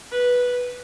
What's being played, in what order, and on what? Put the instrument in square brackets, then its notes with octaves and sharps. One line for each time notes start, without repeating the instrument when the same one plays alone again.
[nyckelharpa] B4